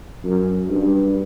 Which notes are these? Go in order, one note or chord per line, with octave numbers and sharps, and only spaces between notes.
F#2
G2